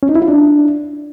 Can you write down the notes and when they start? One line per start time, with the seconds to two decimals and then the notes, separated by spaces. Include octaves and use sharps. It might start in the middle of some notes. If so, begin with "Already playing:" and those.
0.03 C#4
0.09 D#4
0.15 E4
0.22 F4
0.28 D4